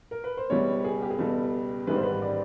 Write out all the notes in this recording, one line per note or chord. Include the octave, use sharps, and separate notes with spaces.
A#4
B4
C5
C#2 B2 G3 C#5
G#4
G4
G#4
C#2 B2 G3 A4
A1 G#2 D#3 G3 B4
C5
B4
D5